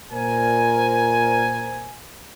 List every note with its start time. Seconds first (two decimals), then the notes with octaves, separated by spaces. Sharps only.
0.12 A#2 A#4 C5 G#5